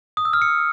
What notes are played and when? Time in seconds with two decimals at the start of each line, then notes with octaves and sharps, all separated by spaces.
0.17 D#6
0.25 E6
0.33 F6
0.42 C#7